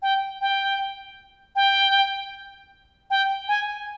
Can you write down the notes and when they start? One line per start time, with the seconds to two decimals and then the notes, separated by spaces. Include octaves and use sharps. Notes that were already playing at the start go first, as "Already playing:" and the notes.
0.02 G5
0.41 G5
1.56 G5
3.10 G5
3.48 G#5